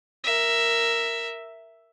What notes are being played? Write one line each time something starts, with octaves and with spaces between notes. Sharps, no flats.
A#4 E5